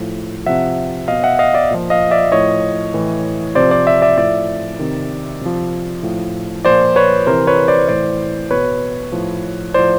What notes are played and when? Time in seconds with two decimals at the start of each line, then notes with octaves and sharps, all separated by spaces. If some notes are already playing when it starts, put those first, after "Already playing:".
Already playing: A2 F3
0.46 C3 F3 E5 F#5
1.08 B2 D#5 F5
1.23 E5 F#5
1.39 D#5 F5
1.54 D5 E5
1.71 A#2 F3
1.90 D#5 F5
2.11 D5 E5
2.32 A2 F3 C#5 D#5
2.94 A2 E3
3.55 C3 F3 C5 D5
3.71 C5 D5
3.87 D5 E5
4.02 D5 E5
4.18 A2 F3 D5 E5
4.79 C3 D#3
5.41 C3 F3
6.03 A2 F3
6.65 A#2 F3 C5 D5
6.96 B4 C#5
7.27 C3 E3 A#4 C5
7.47 B4 C#5
7.68 C5 D5
7.88 A2 E3 C5 D5
8.51 B2 B4 C#5
9.12 A2 F3
9.74 A2 F3 C5 D5